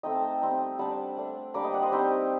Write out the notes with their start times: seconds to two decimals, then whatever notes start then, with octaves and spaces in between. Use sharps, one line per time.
0.03 A3 C4 D#4 D#5 G5
0.15 A5
0.22 G5 A#5
0.41 G3 C4 D#4
0.79 G3 D4 F#5 A5
1.17 A3 D4
1.54 G3 A#3 D4 A#5 D6
1.64 D#5 G5
1.73 D5 F#5
1.82 C5 D#5
1.92 G3 C4 D#4 G4